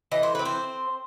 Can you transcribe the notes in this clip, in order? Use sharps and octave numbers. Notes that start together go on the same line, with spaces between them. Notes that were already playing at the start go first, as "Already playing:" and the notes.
E3 D#5
C5
C4 B4
C5